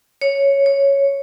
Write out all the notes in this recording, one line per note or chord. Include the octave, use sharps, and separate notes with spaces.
C#5
C#5